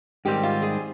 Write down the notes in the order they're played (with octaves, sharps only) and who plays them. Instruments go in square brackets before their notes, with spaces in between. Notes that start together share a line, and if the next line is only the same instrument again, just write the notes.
[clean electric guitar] G#2 D#3 G3 C4 [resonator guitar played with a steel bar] G4
[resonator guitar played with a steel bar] F4
G#4